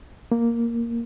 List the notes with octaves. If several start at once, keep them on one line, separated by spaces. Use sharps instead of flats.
A#3